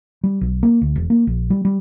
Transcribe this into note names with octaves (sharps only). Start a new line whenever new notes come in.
G3
B1
A#3
D2
E1
A#3
A#1
G3
G3